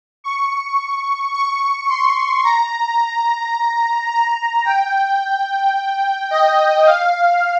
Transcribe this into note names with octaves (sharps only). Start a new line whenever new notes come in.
C#6
C#6
C6
A#5
A#5
G5
D#5
F5